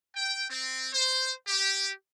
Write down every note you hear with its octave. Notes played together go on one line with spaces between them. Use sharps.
G5
C4
C5
G4